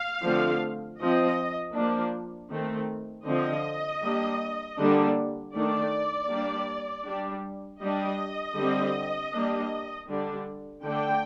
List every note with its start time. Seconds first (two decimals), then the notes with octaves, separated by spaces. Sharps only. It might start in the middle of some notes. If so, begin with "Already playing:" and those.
Already playing: F5
0.23 D3 F3 A3 C4
0.99 F3 C4 D#5
1.75 F3 A#3 D4
2.51 D#3 A3 C4
3.27 D3 F3 C4 D#5
4.02 G3 A#3 D4
4.78 D3 G3 A#3 D4
5.54 D#3 A3 D4 D5
6.30 G3 A#3 D4
7.06 G3 D4
7.81 G3 D4 D#5
8.58 D3 G3 C4
9.33 G3 A#3 D4
10.09 D3 G3 D4
10.84 D3 A3 D4 G5